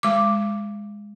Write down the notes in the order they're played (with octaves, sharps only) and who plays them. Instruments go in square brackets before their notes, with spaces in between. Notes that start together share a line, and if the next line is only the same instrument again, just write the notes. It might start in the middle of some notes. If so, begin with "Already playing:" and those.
[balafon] G#3 D6